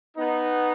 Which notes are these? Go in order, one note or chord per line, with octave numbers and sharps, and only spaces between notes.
B3 D#4